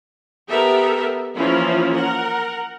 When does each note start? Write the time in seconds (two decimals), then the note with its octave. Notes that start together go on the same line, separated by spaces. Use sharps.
0.48 B3 G4 A4 A#4 E5
1.34 E3 F3 A#3 C#4 E4 F4
1.94 A#4 F#5